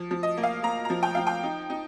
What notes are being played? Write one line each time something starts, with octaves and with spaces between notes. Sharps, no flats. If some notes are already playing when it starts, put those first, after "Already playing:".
Already playing: F3
F3
D#5
A#3
F5
A#3 A#5
A#5
F3
G5
F3 F5
G5
D#4
D#4